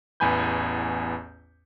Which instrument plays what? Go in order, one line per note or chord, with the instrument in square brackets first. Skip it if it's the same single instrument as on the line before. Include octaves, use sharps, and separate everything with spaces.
[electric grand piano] A1 E2 B3 G#5 B5 G6